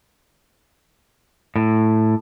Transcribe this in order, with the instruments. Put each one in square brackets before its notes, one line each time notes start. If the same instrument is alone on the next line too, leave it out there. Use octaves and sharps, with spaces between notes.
[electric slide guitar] A2